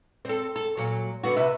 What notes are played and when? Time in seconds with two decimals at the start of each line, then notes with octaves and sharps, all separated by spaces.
0.25 C4 A4
0.56 A4
0.77 A#2 F#3
1.24 D3 B3 F#4
1.36 C3 B4 E5